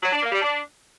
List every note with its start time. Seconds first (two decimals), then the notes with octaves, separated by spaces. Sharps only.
0.03 F#3
0.13 D4
0.22 A#3
0.32 G3
0.42 D4